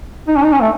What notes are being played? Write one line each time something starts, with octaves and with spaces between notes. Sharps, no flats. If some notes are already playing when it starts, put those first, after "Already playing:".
D#4
C#4
D#4
C#4
A3